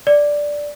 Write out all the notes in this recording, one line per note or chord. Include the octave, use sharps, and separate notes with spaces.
D5